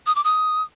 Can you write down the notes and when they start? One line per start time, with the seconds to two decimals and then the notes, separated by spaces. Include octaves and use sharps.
0.07 D#6
0.15 D6
0.24 D#6